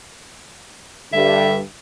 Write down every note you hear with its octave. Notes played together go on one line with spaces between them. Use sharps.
G2 D3 G3 E5